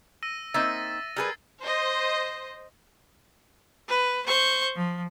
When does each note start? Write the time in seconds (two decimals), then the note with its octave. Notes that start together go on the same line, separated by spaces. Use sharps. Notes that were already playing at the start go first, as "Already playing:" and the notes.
0.23 E6 A#6 D#7
0.54 A#3 C4 D#4 E5 A6
1.16 G3 G#4 A#4 B4 E6 G#6 C7
1.61 C5 D#5
3.88 B4
4.26 C5 C#6 G6
4.76 F3